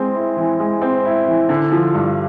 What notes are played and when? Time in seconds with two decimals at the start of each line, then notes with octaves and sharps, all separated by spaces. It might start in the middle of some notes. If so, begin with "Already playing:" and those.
Already playing: G#3 C4
0.15 E4
0.37 E3
0.60 G#3
0.82 C4
1.05 E4
1.27 E3
1.49 D3
1.72 F3
1.95 G2